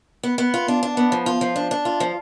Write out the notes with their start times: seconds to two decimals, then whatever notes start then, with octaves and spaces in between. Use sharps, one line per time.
0.23 B3
0.38 B3
0.54 F4
0.68 D4
0.83 D4
0.97 B3
1.12 F3
1.26 F4
1.41 F3
1.56 D4
1.71 D4
1.85 F4
2.00 F3